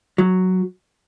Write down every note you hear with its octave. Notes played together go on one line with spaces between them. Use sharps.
F#3